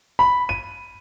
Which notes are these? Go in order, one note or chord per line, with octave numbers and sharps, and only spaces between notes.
B5
D#7